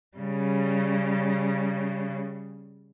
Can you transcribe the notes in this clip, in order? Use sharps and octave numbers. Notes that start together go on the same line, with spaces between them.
C#3 G3